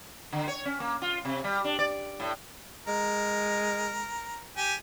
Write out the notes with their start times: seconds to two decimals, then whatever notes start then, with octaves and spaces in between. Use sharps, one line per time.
0.33 D3
0.48 C#5
0.65 C#4
0.80 A#3
1.02 F4
1.25 C3
1.44 G3
1.64 D4
1.79 D5
2.20 A2
2.88 G#3 A#4
4.57 G4 G#5